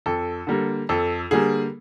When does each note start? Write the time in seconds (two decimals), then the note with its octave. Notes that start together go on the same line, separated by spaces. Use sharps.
0.06 F2 A4
0.47 D3 G3 A#3
0.89 F2 A4
1.31 D3 G3 A#3 G#4